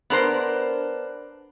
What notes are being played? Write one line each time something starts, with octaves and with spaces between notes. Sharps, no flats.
B3 D4 A#4 C5